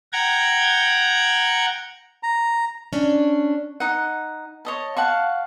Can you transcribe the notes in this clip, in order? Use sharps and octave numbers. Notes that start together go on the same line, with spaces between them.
F#5 G5 A#5 G#6
A#5
C#4 D4
D#4 F#5
C#5 D#5 A5
F5 F#5 A5 C#6